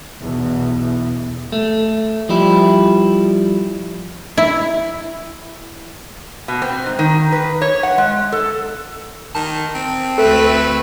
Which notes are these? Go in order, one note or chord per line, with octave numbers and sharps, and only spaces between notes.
B1 E2 B2
A3
F3 G3 E4
E4
B2
C4
G#2
D#3
B4
C#5
F#5
G#3
A4
D#3 A5
C4
D2 A3 A4 B4 E5